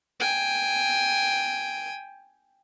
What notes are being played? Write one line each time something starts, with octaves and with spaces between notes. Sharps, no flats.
G5 G#5